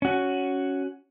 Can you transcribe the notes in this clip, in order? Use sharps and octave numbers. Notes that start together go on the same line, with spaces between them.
C#4 F#4